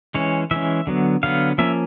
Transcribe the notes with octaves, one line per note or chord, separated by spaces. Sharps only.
E3 G#3 C#4 C#5
E3 G#3 C#4 E5
D3 F#3 B3
D3 F#3 B3 F5
F3 A#3 C#4 E5